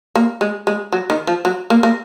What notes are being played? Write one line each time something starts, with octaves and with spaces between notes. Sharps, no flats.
A#3
G#3
G#3
F#3
D#3
F3
F#3
A#3
A#3